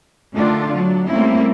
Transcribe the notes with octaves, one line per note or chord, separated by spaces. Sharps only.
D3 D#3 A3 D4 F4
F#3 D4
G3 A3 A#3 C4 C#4 E4